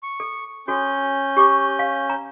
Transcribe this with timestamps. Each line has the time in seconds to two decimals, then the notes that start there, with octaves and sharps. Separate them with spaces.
0.03 C#6
0.20 A4
0.68 C#4 F#4 A4 G6
1.37 G4 C#6 D6
1.79 F5
2.10 A#5